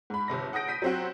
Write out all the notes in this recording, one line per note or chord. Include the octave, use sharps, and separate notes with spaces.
G#2 B5
G1 C3 A#6
F#5 D#6 G6 A#6 D7
G6 B6 D#7
F#3 C4 F#4